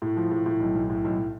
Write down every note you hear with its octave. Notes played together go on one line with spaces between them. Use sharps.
A2
F3
A2
A2
B1
B1
A2
B1